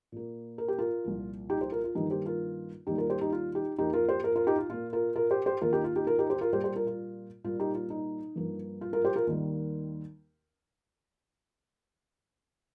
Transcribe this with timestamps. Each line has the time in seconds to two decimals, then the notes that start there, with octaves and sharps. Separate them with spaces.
0.12 A#2 A#3
0.58 A#4
0.68 G4
0.78 F4 A#4
1.04 C2 A#2 F3
1.50 D#4 G4
1.61 G4 C5
1.72 F4 A#4
1.84 F4
1.95 G2 D#3 A#3 D#4 G4
2.10 G4 C5
2.26 F4 A#4
2.87 D#2 D#3 G3 D#4 G4
2.98 F4 A#4
3.10 G4 C5
3.21 D#4 G4
3.32 F4
3.55 D#4 G4
3.78 F2 F3 A#3 D#4 G4
3.94 F4 A#4
4.09 G4 C5
4.24 F4 A#4
4.36 F4 A#4
4.47 D#4 G4
4.58 F4
4.70 A#2 A#3 F4
4.93 F4 A#4
5.15 F4 A#4
5.31 G4 C5
5.46 G4 C5
5.61 D#2 D#3 A#3 F4 A#4
5.73 D#4 G4
5.84 F4
5.96 D#4 G4
6.07 F4 A#4
6.19 D#4 G4
6.30 G4 C5
6.41 F4 A#4
6.53 A#2 G3 A#3 G4 C5
6.64 G4 C5
6.76 F4 A#4
6.87 F4
7.44 A#2 G3 A#3 F4
7.60 D#4 G4
7.75 F4
7.90 D#4
8.36 G2 F3 A#3
8.81 F4
8.93 F4 A#4
9.05 G4 C5
9.16 F4 A#4
9.27 D#2 D#3 G3 A#3